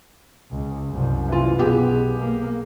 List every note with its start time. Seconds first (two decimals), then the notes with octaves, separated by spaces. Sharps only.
0.51 C#2
0.89 C2 F#2
1.29 E3 F4
1.58 B1 B3 G4 G#4
2.19 A#3